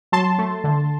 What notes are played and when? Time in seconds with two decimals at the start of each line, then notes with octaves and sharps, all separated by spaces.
0.12 F#3 A5 C6
0.38 A3
0.64 D3